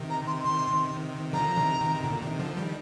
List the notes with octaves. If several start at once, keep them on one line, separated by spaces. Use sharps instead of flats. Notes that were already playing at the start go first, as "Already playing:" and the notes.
Already playing: C3 D#3
A#5
C6
C6
D3 F3 A#5
C3 D#3
C3 D#3
C3
A#2 D3
C3 D#3
D3 F3
D#3 G3